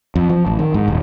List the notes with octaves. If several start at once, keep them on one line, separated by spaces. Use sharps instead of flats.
F2
F3
A1
D#3
G#2
D#1